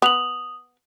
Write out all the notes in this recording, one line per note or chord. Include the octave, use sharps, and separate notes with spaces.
B3 D#6 F7 F#7